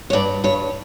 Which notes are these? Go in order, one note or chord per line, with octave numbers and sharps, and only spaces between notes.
C#5
G2 D5
G2 C#5